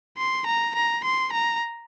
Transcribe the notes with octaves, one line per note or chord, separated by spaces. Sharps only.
C6
A#5
A#5
C6
A#5